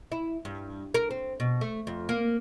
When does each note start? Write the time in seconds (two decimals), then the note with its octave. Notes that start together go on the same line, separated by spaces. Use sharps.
0.12 E4
0.45 G2
0.94 A#4
1.10 C4
1.40 B2
1.61 A3
1.87 F2
2.09 A#3